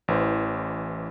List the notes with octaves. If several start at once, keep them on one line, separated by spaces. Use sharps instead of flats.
A1 E3 C5